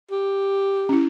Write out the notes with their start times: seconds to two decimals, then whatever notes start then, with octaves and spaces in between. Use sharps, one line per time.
0.11 G4
0.89 C#4 E4